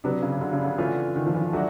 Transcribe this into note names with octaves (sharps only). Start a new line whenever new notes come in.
C3 F#3 B3 D4
C#3
D3
C#3
D3
E3 A3 C#4 F4
D#3
F3
E3
F#3 A3 D4 F#4